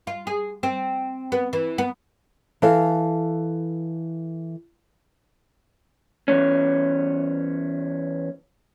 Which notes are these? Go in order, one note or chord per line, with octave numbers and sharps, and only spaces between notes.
F4
G#4
C4
B3
E3
B3
E3 A4 F5
E2 G2 C#4